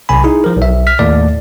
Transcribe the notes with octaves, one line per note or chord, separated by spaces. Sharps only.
B1 C3 G#5 B5
D#4 E4 G#4
F3 A#4
B1 E5
F6 B6
D#2 A2 A3 D5